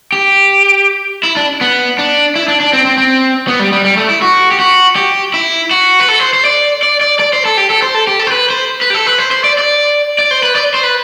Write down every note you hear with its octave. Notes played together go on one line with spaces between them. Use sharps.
G4
E4
D4
B3
D4
E4
D4
D4
C4
C4
C4
B3
G3
G3
G3
A3
E4
F#4
G4
F#4
G4
E4
F#4
B4
A4
C5
C5
D5
D5
D5
D5
C5
A4
G4
A4
C5
A4
G4
A4
C5
B4
C5
B4
G4
A4
B4
C5
C5
D5
D5
D5
C5
B4
D5
C5
B4